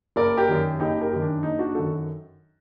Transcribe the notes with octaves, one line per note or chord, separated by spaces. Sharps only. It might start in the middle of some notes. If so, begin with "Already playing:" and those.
F#1 A#4 D5
G4 A#4
F#2 D#3
F#1 D#4 G4
G4 A#4
F#2 D#3
D4
F#1 D#4
D4 F#4
F#2 D#3 F#4 A4